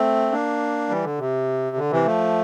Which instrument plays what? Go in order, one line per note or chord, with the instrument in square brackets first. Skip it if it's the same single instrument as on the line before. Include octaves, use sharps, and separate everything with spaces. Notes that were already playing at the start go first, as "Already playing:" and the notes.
Already playing: [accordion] A3 C4
A#3 D4
E3 G3
D3
C3
D3
C3 E3
F3 A3